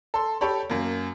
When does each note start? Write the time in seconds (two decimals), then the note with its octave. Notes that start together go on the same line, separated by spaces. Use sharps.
0.14 A4 C6
0.41 G4 A4 C#5 B5
0.70 F#2 A#3